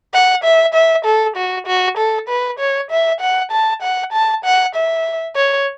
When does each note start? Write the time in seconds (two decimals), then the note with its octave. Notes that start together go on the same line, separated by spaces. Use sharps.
0.14 F#5
0.44 E5
0.74 E5
1.05 A4
1.36 F#4
1.67 F#4
1.97 A4
2.29 B4
2.59 C#5
2.91 E5
3.21 F#5
3.52 A5
3.82 F#5
4.13 A5
4.45 F#5
4.75 E5
5.36 C#5